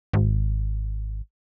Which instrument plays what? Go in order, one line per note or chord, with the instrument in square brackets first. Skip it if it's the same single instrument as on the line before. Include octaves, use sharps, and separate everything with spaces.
[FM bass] G#1